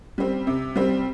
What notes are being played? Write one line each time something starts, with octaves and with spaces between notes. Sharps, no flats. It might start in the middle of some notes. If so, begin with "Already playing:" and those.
G3 C4
C3
G3 C4